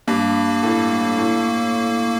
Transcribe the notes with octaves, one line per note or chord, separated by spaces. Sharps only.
G2 A#3
A2
A2